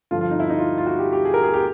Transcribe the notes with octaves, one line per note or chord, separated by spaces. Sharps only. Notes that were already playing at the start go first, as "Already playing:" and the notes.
G2 D3 F3 F4
F4
D#4
E4
D#4
F4
F4
F#4
G4
G4
G#4
A#4
G#4
G4